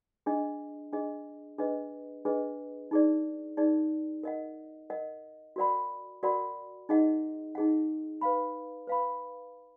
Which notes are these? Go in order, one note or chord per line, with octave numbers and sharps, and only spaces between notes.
D4 G#4 D#5
D4 G#4 D#5
D4 G#4 B4 D#5
D4 G#4 B4 D#5
D#4 G#4 D5
D#4 G#4 D5
A#4 D#5 F#5
A#4 D#5 F#5
F#4 A#4 D5 F#5 B5
F#4 A#4 D5 F#5 B5
D#4 G#4 D#5 F#5
D#4 G#4 D#5 F#5
B4 F5 B5
B4 F5 B5